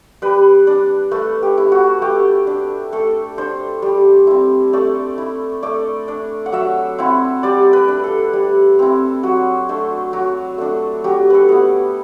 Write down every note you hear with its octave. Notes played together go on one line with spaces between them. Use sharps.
G3 B4
D4
A3 B4
G4
E4
F#4
A3 G4
D4
A3 A4
D4 C5
G3
C4 E4
A3 D5
E4
A3 D5
D4
F#5
F#3 E5
C4 E4 F#5
G3 D5
B4
D4
A4
G3
C4 E4
F#3 F#4
A3 D4
F#3
A3 D4
F#3 G4
A4 B4
B3 E4